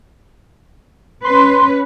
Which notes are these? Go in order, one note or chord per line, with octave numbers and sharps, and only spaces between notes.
C#4 B4 C6